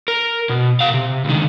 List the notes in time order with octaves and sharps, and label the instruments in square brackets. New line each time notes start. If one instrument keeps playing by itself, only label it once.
[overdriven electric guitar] A#4
B2
B2 F5
C3
C#2 D#3